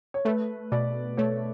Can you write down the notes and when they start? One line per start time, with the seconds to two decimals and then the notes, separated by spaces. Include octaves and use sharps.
0.14 C#5
0.25 A3 B4
0.72 B2 D5
1.17 A3 C#5